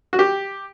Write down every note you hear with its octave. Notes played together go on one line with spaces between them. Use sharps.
F#4
G4